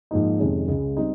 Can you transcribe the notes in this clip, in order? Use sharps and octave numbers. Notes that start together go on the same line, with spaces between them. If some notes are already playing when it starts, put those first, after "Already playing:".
G#2 F3 A#3 D#4
F2 C3 D#3 G#3 C#4
C#2 C#3 G#3
G3 C4 D#4